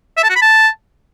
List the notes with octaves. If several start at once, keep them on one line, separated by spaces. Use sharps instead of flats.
E5
A5
F#4
B5
A5